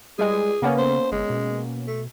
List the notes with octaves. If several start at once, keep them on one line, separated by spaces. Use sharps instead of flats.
G3 G#3 G#4
C#3 A#3 B3 C#4
C5
G1 G#3
B2
A3